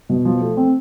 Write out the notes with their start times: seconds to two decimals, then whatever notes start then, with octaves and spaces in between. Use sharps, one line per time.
0.09 B2
0.25 F3
0.41 A3
0.57 C4